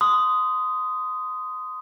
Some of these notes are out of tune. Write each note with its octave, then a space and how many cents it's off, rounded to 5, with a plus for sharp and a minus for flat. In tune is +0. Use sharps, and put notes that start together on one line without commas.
C6 -25 D#6 +0